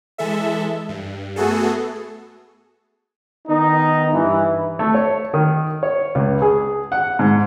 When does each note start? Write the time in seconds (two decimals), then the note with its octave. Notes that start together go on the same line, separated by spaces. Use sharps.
0.18 E3 G#3 A4 E5
0.89 G2
1.36 A3 B3 F#4 G#4 A4
3.48 D#3 B3 D#4
4.12 G2 E3
4.79 A3
4.94 C#5
5.34 D#3
5.83 C#5
6.15 C#2
6.42 G#4
6.92 F#5
7.19 G#2